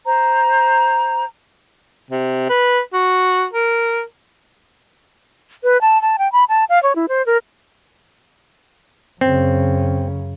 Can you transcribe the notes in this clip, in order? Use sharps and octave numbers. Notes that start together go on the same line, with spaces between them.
C5 A#5
C3
B4
F#4
A#4
B4
A5
A5
G5
B5
A5
F5
C#5
E4
C5
A#4
F#2 C#3 C4